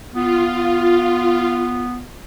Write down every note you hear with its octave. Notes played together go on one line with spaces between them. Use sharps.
B3 F4